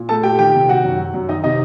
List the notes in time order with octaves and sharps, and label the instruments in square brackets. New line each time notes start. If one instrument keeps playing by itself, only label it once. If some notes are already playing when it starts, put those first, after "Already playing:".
Already playing: [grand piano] A#2
A3 A4 A5
A#2 G4 G5
D#3 G4 G5
C3
D#3 F#4 F#5
F#2
F#3
F#2
D#3 D#4 D#5
C3 D#4 D#5